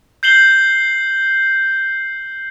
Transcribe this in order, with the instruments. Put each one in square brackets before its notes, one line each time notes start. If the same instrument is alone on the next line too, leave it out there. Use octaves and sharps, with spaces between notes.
[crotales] G6 C7 F#7 G7